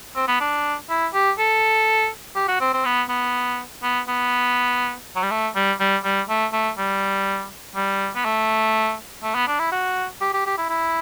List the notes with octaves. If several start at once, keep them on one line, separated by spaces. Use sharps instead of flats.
C4
B3
D4
E4
G4
A4
G4
F#4
C4
C4
B3
B3
B3
B3
F#3
G3
A3
G3
G3
G3
A3
A3
G3
G3
B3
A3
A3
B3
D4
E4
F#4
G4
G4
G4
E4
E4